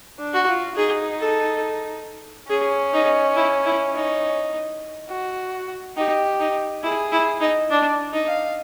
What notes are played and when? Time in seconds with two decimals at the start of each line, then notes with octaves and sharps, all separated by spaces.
0.19 D4
0.33 F#4
0.47 F4
0.76 D#4 G#4
1.19 A4
2.50 C#4 G#4
2.93 D#4
3.36 E4
3.65 E4
3.94 D#4
5.09 F#4
5.97 D#4 G4
6.39 D#4
6.83 E4 G#4
7.12 E4
7.41 D#4
7.70 D4 D5
8.13 D#4
8.28 F5